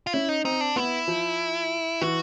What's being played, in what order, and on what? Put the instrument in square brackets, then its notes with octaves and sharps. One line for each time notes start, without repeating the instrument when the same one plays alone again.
[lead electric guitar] F4
[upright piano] C#4 [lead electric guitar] E4
[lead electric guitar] D#4
[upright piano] C4 [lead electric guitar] D#4
[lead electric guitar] D4
[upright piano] B3 [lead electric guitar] E4
[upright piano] F3
[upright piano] E3 [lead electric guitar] F#4